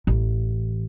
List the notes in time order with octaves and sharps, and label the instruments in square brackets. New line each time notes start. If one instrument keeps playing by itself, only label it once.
[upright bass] A1